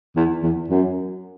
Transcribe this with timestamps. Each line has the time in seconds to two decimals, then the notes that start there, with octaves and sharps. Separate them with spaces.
0.16 E2
0.43 E2
0.70 F#2